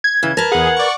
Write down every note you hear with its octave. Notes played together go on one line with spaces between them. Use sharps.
G#6
C#3 E3
A#4 B4 A5
E2 G#4 F#5
D5 C#6